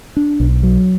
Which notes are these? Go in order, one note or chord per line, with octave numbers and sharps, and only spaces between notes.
D4
B1
F#3